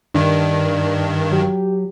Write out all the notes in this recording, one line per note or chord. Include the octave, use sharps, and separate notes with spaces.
G2 D#3 D4
F#3 G4